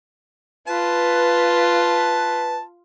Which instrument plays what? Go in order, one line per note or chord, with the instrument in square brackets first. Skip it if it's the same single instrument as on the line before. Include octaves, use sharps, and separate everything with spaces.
[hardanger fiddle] F4 [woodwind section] B4 [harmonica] A5